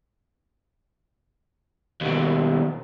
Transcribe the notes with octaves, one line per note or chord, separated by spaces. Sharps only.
D#2 B2